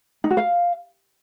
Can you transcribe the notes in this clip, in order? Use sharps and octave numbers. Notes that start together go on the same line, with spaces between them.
D#4
F#4
F5